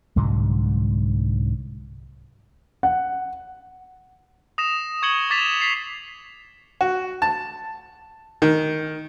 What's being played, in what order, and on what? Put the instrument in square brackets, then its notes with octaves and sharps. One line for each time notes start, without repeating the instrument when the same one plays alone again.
[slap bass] C2 G#2 D3 F#3
[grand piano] F#5
[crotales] D#6 A#6 E7
C#6 G#6 C#7 F#7 G7
D6 A6 B6 E7 F7 G7
A6 B6 C7
[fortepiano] F#4
A5
D#3